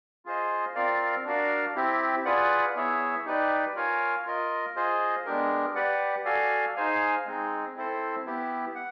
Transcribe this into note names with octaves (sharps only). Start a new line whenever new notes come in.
F4 G#4 C5 D#5
C4 F4 A#4 D5 F5
D4 F#4 A#4 D5 F5
C4 E4 G4
F4 G#4 B4 D5 F#5
B3 E4 G#4 C#5 E5
D#4 G4 B4 D5
F4 A#4 C#5 F5 G#5
F4 A#4 D#5
F4 G#4 C5 D#5
G#3 B3 D4 G4 A#4
G4 B4 D5 F#5
F#4 A4 D5 F5 G#5
D#4 G#4 C5 F5 G#5
G#3 C4 D#4 G#4
C4 E4 A4 C5
B3 E4 G4
F#5